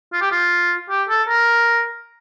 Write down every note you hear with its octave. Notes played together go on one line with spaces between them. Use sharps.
F4
G4
F4
G4
A4
A#4